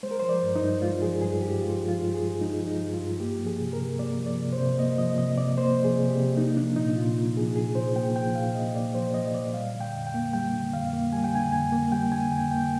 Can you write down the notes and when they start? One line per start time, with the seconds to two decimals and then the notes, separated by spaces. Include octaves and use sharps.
0.03 G#3 C5
0.11 A#4
0.20 F3 C5
0.29 D5
0.43 G2
0.56 D#4
0.62 G2
0.82 G#3 F4
1.01 F3 G#4
1.21 G2 G#4
1.42 G2 G4
1.61 G#3 F4
1.81 F3
1.88 F4
2.01 G2
2.14 G#4
2.21 G2
2.41 G#3 D#4
2.60 F3
2.67 D#4
2.80 G2
2.94 F4
3.01 G2
3.20 A#3 G4
3.39 F3
3.46 G#4
3.60 C3
3.73 A#4
3.79 C3
3.99 A#3 D5
4.19 F3
4.26 D5
4.39 C3
4.53 C5
4.59 C3
4.79 A#3 D#5
4.98 F3 D#5
5.18 C3 D#5
5.38 C3 D5
5.58 A#3 C5
5.77 F3
5.84 G#4
5.97 C3
6.10 G4
6.17 C3
6.37 A#3 D#4
6.57 F3 D4
6.76 A#2 D#4
6.96 A#2 F4
7.16 A#3
7.36 F3 G#4
7.56 A#2 G#4
7.75 A#2 C5
7.96 A#3 G5
8.16 F3 G5
8.35 A#2 F5
8.55 A#2 D#5
8.75 A#3 D5
8.95 F3 C5
9.14 A#2 D#5
9.34 A#2 D5
9.54 G3 F5
9.74 D3
9.81 G5
9.94 F2
10.07 G5
10.14 A#3
10.33 G3 G5
10.53 D3
10.73 F2 F5
10.93 A#3
11.12 G3 G#5
11.24 G5
11.33 D3 G#5
11.52 F2 G#5
11.72 A#3
11.92 G3 G5
12.12 D3 G#5
12.31 F2 G5
12.51 A#3 G5